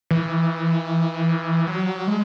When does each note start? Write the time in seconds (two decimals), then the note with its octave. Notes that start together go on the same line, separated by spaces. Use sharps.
0.11 E3
1.67 F#3
2.07 G#3